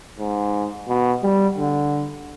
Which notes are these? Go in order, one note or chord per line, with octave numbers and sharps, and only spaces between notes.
G#2
B2
G3
D3